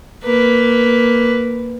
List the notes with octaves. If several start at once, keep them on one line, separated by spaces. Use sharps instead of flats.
A#3 B4